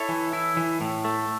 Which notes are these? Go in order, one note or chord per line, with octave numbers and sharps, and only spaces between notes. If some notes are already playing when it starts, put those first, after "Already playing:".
Already playing: E4 A4 C#5
E3
E4
E3
A2
A3